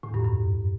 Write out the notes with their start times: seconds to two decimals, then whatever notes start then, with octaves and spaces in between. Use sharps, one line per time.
0.03 A2
0.09 E2
0.14 G2
0.19 F#2
0.25 G2